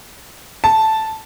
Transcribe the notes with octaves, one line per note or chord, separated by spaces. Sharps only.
A5